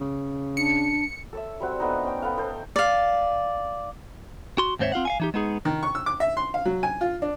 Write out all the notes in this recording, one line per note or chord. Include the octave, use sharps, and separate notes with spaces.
C#3
D4 C#7
A4 C#5 E5
G3 C4 F#4
A3 B3 D4 D#4
C#4 G5
B3 A4 F5
A4 C5 D#5
D5 F5
F#4 C6
D#2 G#2 C4 C5 C#5 E5
C4 F4 F5 F#5
F5 F#5 G#5
E3 D#4 G4
G#3 B3 D#4 G#4
D#3
C#6
E6
D6
E5
C6
F5
F#3
G#5
F4
D4